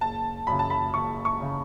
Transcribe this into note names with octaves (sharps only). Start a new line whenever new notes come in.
F#1 A5
F#2 C#3 B5
A5
B5
F#1 C#6
C#6
C#3